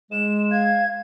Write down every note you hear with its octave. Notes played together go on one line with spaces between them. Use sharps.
G#3 E7
F5 G#6